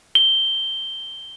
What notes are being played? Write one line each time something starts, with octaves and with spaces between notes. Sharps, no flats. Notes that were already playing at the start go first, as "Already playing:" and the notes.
G7